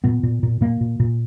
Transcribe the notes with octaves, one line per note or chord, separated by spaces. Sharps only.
A#2 B3
A#2
A#2
A#2 A#3
A#2
A#2